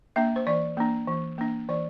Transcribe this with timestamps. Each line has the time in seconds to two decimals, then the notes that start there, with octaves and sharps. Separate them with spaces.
0.16 A#3 D4 E5
0.36 C5
0.47 E3 D5
0.77 A#3 D4
1.08 E3
1.38 A#3 D4
1.68 E3 D5